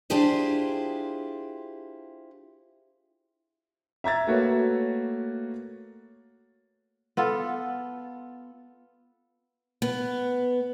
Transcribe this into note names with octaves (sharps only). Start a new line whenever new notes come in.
D4 E4 F4 G4 G#4 C5
E5 A#5 G#6 A6
A3 A#3 F#4 B4 C#5
B3 F4 A4
B3